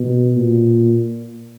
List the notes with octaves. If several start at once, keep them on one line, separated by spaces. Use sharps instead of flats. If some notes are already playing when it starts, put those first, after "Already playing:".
Already playing: B2
A#2